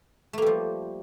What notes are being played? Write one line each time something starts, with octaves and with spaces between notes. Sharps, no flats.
F3 G3 A3 A#3